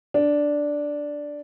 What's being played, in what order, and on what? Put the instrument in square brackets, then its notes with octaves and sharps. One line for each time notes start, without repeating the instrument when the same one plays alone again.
[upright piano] D4